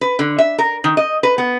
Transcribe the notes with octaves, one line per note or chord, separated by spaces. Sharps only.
B4
D3
E5
A#4
D#3
D#5
B4
B3